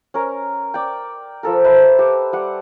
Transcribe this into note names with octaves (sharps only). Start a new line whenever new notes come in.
C#4 A#4
D5 G5
F3 A4 A#4
B4 C5 E5 A5
G4
G3 F#5